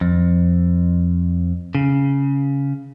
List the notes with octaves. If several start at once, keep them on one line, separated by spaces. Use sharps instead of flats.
F2
C#3